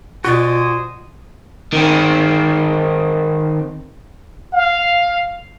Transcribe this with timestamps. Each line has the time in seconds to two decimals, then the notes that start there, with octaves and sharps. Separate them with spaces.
0.25 B2 F4 F#4 C5 D5 G#5 D#6
1.73 D#3 C4
4.53 F5